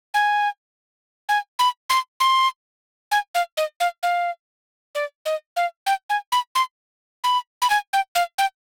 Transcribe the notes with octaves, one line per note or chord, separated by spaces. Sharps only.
G#5
G#5
B5
C6
C6
G#5
F5
D#5
F5
F5
D5
D#5
F5
G5
G#5
B5
C6
B5
B5
G#5
G5
F5
G5